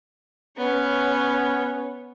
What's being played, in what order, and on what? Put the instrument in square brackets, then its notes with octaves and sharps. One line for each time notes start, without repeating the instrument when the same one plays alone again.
[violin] B3 C#5 [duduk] C#4